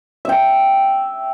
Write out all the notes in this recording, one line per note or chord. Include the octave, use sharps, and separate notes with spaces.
E5 G5